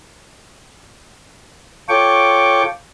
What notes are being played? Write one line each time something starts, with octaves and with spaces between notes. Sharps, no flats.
F4 A4 C#5 G5 C#6 D6